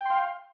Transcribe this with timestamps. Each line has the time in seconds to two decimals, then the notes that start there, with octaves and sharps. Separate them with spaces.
0.01 G5
0.05 C6
0.10 F5